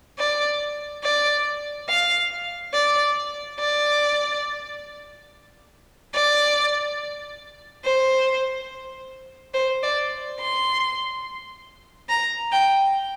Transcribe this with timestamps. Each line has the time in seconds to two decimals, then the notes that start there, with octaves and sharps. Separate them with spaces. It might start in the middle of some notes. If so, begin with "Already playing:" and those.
0.18 D5
1.03 D5
1.88 F5
2.73 D5
3.59 D5
6.13 D5
7.84 C5
9.54 C5
9.83 D5
10.40 C6
12.09 A#5
12.52 G5